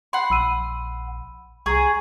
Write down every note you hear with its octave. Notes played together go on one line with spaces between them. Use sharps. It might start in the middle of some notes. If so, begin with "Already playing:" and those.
F#5 B5 C6
A#1 B5 E6 D#7
C2 G#4 A#5 C#6